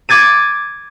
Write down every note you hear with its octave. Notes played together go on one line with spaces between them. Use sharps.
D6 G#6 A6 D#7